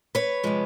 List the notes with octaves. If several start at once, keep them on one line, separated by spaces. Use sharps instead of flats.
B4 C#5
C3 F3 G#3